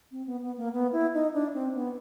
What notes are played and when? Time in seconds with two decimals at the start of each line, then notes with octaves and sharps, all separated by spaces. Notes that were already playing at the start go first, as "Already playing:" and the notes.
0.11 C4
0.26 B3
0.41 B3
0.58 A#3
0.73 B3
0.93 E4
1.14 D#4
1.34 D4
1.54 C4
1.74 B3